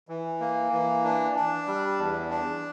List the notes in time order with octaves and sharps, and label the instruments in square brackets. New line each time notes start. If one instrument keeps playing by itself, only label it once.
[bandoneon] E3
A#3
E3
D4
D4
G3
E2
D4